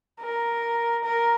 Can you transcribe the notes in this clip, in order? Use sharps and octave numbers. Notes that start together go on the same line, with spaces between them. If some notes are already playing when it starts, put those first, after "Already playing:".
A#4
A#4